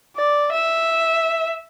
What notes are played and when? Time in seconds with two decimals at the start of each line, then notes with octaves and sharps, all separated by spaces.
0.17 D5
0.52 E5